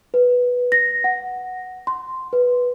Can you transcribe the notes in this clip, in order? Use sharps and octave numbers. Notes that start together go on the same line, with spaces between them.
B4
A#6
F#5
C6
B4